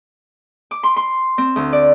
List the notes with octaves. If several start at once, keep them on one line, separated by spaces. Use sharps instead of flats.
D6
C6
C6
C4
D2
D5